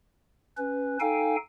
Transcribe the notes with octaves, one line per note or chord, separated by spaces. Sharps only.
C#4 B4
D#4 A4 F5 G5 G#5